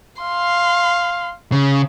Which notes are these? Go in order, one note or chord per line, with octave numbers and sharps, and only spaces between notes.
F5 C6
C#3